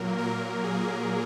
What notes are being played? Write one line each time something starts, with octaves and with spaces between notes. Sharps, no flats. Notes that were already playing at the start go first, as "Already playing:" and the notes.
Already playing: A#2 F#3 A#3 A#4
A#4
G#4